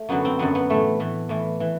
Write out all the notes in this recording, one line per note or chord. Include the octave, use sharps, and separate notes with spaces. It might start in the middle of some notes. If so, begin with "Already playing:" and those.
Already playing: A3
F#2 D3 F#3 B3
C4
F#2 D3 F#3 B3
B3
A2 E3 A3
A2 E3
A2 E3
E3